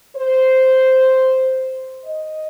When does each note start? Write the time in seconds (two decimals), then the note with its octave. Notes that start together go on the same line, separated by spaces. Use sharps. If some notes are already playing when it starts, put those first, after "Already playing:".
0.16 C5
2.05 D#5